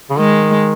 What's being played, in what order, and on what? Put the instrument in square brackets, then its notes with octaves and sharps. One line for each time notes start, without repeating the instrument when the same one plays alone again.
[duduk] C#3
[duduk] D#3 [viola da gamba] G#3